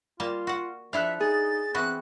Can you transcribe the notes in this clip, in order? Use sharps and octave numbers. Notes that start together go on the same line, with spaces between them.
G3 A#3 F4 A5
F#4 F#5
F3 D4 E4 A4 E5 F6 F#6
D#4 G#4 A6
E3 B3 C4 F#4 F#6